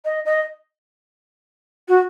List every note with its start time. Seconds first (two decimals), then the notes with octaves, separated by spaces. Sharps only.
0.05 D#5
0.25 D#5
1.88 F#4